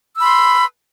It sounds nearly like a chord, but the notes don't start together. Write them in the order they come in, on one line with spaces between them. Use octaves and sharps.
E6 B5 C6